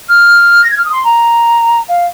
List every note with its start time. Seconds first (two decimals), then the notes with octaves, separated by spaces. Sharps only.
0.09 F6
0.64 A#6
0.71 G#6
0.78 F6
0.85 D#6
0.92 C6
1.04 A#5
1.89 F5